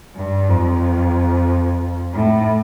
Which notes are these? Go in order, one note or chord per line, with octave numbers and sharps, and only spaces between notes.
G2
F2
A2